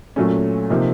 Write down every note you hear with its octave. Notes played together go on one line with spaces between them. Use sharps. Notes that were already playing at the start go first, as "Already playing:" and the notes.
A#2 F#3 A3 C#4
C3 F3 A#3 D#4